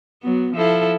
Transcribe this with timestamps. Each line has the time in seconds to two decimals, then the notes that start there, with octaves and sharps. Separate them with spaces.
0.23 F#3 B3
0.54 F3 E4 A4